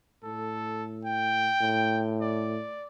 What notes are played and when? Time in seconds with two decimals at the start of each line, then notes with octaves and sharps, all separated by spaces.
0.24 A2 A4
1.05 G5
1.61 A2
2.21 D5